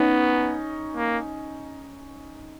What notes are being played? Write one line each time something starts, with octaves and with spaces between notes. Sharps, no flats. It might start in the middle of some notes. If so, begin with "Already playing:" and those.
Already playing: B3 C#4 D#4
A#3